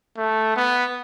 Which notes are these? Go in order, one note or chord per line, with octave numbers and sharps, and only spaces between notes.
A3
B3